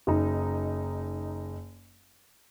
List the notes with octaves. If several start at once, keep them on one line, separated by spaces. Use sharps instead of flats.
F#1 D#4